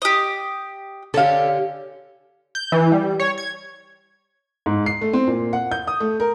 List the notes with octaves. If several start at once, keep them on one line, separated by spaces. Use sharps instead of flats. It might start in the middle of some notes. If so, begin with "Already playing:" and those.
G4 D#5
D3 C#4 G4 A4 F5
G6
E3
G3
C#5
G#6
G#2
C7
A3
C4
A#2
F#5
G6
D#6
A3
A#4